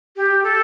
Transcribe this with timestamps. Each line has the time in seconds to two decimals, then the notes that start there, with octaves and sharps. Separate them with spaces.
0.16 G4
0.44 A4